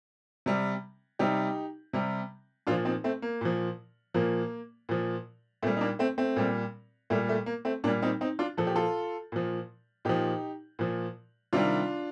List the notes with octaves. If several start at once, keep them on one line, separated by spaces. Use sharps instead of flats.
C3 G3
C3 G3 D#4 G4
C3 G3
A#2 F3 D4 F4
C4 D#4
A3 C4
A#3
A#2 F3
A#2 F3 A#3
A#2 F3
A#2 G3 A3 C4
D#4
A#3 D4
A3 C4
A3 C4
A#2 G3
A#2 G3 A3
A3
A#3
A3 C4
A#2 G3 A#3 D4
C4 D#4
C4 D#4
D4 F4
A#2 F3 A4
G4
F4 A4
A#2 F3
A#2 F3 D#4 G4
A#2 F3
C3 D#3 G3 D4 F4